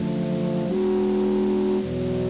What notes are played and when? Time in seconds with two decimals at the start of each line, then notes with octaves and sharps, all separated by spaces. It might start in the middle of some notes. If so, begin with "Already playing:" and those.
Already playing: F#2 D3 F3 A3
0.68 G#3 B3 D4 F#4
1.81 E2 B2 F#3